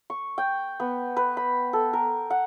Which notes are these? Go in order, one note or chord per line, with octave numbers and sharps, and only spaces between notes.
C#6
G5
B3
B4
B5
A4
A#4
F#5